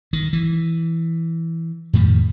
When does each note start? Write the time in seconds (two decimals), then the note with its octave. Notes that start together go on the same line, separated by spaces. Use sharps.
0.13 D#3
0.33 E3
1.93 F2 A2 D#3 G3